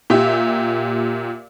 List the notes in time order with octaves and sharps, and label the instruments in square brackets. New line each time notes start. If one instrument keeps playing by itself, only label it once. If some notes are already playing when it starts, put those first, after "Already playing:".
[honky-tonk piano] A#2 G4 E5